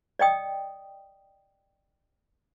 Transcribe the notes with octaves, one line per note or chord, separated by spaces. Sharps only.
D5 D#5 G5 D#6